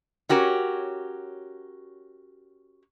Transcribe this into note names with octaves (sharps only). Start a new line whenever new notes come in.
C#4 F#4 G4 A#4 C#5